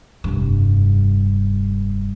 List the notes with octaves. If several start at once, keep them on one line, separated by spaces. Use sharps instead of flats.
F1 G2